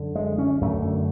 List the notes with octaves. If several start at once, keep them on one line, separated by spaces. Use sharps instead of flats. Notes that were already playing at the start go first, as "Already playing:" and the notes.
Already playing: F#2 D3
G#3
C#4
F#2 D3 A3